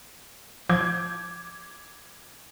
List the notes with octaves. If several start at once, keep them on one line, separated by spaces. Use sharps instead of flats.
F3 D6 G6 G#6